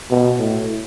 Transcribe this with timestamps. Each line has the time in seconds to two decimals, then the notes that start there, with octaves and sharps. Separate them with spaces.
0.10 B2
0.39 A2